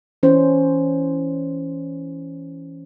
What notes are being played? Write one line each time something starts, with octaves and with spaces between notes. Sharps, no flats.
E3 C#4 C5